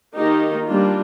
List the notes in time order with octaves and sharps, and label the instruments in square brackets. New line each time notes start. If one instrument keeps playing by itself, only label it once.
[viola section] D#3 A#3 D#4 G4
G3 A#3 D4 F4